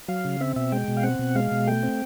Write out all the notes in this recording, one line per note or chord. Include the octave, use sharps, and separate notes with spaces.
F#3 F5
C#3
C4 E5
B2 E5
G#3 G5
B2
F5
C4 F#5
B2
G#3 F5
B2
A3 G5
C4